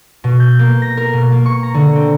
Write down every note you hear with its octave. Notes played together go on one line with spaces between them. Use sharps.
B2
G6
A#3
A#6
A#4
B2
A#3
C#6
A#5
D3
C4